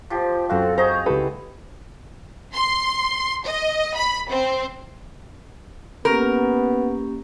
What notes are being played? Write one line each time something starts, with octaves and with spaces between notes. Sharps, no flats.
F3 G4 C5
F#2 C4 F#4 A4 C5 F5
G#4 C5 D#5 A#5 C#6 G6
C#2 E4 G4 A4 B4
C6
D#5
B5
C4
A#3 B3 C#4 G4 A#4